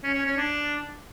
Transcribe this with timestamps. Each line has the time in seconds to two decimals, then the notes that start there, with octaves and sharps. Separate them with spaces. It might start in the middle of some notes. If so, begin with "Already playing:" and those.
0.03 C#4
0.14 C#4
0.25 C#4
0.37 D4